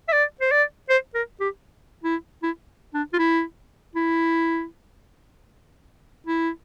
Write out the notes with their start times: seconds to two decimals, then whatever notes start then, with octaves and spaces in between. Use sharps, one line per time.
0.09 E5
0.13 D5
0.41 C5
0.51 D5
0.89 C5
1.15 A#4
1.40 G4
2.04 E4
2.43 E4
2.94 D4
3.13 F4
3.19 E4
3.96 E4
6.27 E4